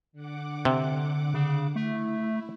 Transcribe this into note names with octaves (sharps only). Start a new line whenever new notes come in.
D3 F#5 D6
C3
C#3
A3 E4